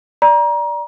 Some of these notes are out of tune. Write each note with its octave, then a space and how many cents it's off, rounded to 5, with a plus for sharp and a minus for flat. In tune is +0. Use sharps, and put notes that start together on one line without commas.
D5 +0 A#5 +25